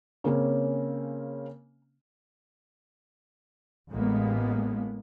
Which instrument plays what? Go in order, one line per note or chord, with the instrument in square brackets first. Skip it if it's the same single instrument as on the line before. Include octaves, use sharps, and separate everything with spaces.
[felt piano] C#3 A#3 C4 C#4
[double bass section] A1 A2 G#3 A#3 B3